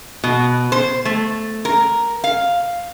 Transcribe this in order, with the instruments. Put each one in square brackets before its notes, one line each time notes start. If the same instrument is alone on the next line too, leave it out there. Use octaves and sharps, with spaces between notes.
[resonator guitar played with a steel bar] B2
C5
A3
A#4
F5